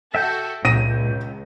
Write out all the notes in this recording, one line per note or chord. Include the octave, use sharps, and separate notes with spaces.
F#4 A4 E5 G5 G6
C#2 A#2 A#6 D#7